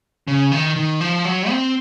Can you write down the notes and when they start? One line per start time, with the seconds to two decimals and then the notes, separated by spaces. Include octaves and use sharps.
0.28 C#3
0.52 D#3
0.76 D#3
1.01 F3
1.25 F#3
1.49 C4